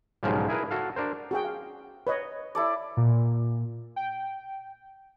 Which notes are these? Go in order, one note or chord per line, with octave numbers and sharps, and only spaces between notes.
B1 G#2 C#3 F3 G3
E4 G#4 A#4 B4
F#4 A4 F5
D4 A#4 C5
F#4 G#4 G5
F5
B4 C#5 D#5
E4 A4 D5
A#2
G5